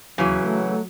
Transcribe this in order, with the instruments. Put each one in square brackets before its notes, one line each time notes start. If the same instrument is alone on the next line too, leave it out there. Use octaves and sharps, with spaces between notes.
[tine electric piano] D#2 [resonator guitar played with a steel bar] C#3 E3 [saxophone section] F#3
[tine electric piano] A3 A4